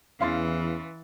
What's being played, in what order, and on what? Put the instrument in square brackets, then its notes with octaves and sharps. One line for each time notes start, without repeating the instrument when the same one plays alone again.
[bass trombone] E2 [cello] E3 [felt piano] C#4 C6 A6 [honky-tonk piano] F5